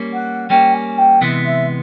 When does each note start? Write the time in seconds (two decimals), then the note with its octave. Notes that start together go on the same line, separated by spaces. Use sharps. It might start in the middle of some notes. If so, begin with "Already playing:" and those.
Already playing: G3 A#3 C#4
0.13 F#5
0.49 G3 A#3 C#4 G5
0.73 G#5
0.98 G5
1.21 C3 E3 G#3 B3
1.45 E5